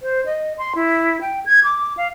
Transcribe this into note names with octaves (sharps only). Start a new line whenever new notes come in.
C5
D#5
C6
E4
G5
G#6
D6
F5